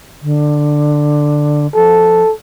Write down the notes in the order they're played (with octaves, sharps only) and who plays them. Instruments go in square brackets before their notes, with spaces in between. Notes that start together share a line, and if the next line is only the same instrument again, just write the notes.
[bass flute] D3
[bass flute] F3 [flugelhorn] A4